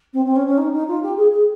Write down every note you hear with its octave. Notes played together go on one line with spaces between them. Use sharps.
C4
C4
C#4
C#4
D#4
D#4
F4
G4
G#4
G#4